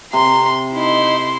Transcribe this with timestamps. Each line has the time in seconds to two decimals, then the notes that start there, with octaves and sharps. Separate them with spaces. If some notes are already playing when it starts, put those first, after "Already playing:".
0.13 C3 A#5 C6
0.74 D#4 E4 C6